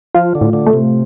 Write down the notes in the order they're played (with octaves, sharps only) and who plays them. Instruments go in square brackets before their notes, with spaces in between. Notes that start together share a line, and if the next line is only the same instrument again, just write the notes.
[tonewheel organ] F3 [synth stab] F4
[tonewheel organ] D3
[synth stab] A2
[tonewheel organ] D3
[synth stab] A3
[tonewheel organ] C3